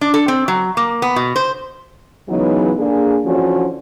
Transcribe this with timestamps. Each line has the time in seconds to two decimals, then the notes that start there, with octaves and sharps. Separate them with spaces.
0.01 D4
0.14 A4
0.28 C4
0.48 F#3
0.77 A#3
1.02 B3
1.16 B2
1.36 C5
2.29 C#3 E3 F#3 G#3 B3 D#4
2.79 D3 A#3 D4 G#4
3.25 D3 E3 F3 C#4 F#4